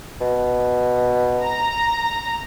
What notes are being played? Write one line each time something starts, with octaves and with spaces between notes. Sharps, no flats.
B2
A#5